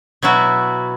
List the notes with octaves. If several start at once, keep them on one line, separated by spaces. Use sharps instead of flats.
B2 F#3 E4 F#4